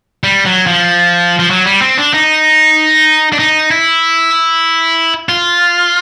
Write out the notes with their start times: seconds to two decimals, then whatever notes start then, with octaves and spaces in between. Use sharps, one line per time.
0.24 G3
0.45 F#3
0.67 F3
1.39 F3
1.50 F#3
1.66 G3
1.82 C4
1.98 D4
2.14 D#4
3.33 D4
3.39 D#4
3.71 E4
5.29 F4